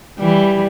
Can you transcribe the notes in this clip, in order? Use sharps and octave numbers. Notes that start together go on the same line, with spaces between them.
E3 G3